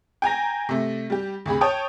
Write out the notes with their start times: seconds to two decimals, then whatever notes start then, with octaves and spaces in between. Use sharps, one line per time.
0.22 G5 G#5 A#5 A#6
0.69 C3 A3
1.10 G3 G4
1.46 D2 C3 G#4 B5
1.61 C#5 G5 A5 D#6